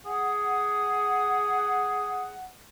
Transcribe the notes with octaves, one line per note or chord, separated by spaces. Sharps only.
G#4 F#5